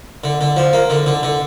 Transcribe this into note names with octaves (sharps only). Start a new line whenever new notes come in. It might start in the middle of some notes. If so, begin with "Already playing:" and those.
D3
D3
F3
A#3
D3
D3
D3